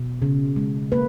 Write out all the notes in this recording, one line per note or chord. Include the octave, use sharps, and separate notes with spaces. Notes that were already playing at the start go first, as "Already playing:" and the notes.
Already playing: B2
C#3
G#3
A#3 B4